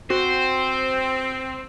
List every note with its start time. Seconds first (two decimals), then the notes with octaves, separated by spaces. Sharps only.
0.10 C4 F#4 C5